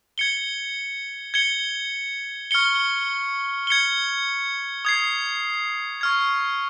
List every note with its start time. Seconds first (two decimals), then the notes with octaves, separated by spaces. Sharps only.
0.18 G#6 C#7 G7
1.34 G#6 C#7 G7
2.51 C#6 F6 G#6 C#7 G7
3.67 G#6 C#7 G7
4.85 D#6 G#6 C7
6.01 C#6 F6 G#6